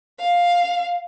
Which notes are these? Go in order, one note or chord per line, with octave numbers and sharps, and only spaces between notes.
F5